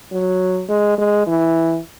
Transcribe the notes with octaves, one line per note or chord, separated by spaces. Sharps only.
F#3
G#3
G#3
E3